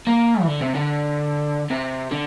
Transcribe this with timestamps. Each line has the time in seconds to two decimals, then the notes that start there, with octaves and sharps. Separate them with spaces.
0.07 A#3
0.41 E3
0.47 D3
0.61 C3
0.75 D3
1.70 C3
2.11 D3